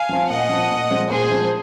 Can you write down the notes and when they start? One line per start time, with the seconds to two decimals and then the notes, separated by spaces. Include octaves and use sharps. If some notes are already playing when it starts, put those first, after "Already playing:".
Already playing: F5 G#5
0.09 F3 C4
0.29 A#2 D#5 F#5
0.49 F3 C4
0.71 A#2
0.90 F3 G#3 C4
1.10 A#2 G#4 C5
1.30 F3 G#3 C4